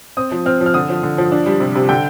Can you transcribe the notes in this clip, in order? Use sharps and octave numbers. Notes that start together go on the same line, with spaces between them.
C4 D#6
F3
C4 F6
F3
F6
D3 D#6
F3
D3
F3
D4
G3
C3
C3
D3 G5